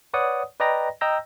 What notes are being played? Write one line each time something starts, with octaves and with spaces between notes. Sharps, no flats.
B4 C#5 D5 F#5 D#6
B4 D5 D#5 G5 A#5 A#6
D#5 G5 A#5 E6 G6 A#6